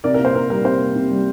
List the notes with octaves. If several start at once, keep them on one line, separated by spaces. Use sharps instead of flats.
C3 A#4 D5
A#4
A#3
C5
C3 A#4
G3 A#4
C3 C5
A#3
C3
G3